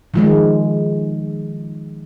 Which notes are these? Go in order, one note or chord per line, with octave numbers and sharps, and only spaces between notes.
D#3 F3 G#3